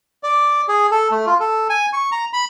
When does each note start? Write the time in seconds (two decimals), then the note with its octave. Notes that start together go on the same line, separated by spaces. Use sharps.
0.23 D5
0.68 G#4
0.91 A4
1.11 A3
1.26 F4
1.40 A4
1.69 G#5
1.93 C#6
2.12 A#5
2.33 B5